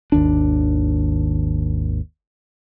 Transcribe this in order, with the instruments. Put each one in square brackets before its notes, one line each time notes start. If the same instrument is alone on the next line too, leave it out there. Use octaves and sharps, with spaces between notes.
[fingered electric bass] G#1 D#2 D4